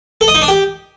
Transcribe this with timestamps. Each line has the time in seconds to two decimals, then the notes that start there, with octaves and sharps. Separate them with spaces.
0.21 A4
0.28 D#5
0.35 D#4
0.41 D4
0.48 G4